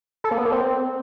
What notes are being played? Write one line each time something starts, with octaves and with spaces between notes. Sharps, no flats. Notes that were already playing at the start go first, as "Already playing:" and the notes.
A4
A#3
B3
A#3
C4